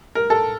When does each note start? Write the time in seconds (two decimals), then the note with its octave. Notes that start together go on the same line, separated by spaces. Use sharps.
0.15 A#4
0.30 A4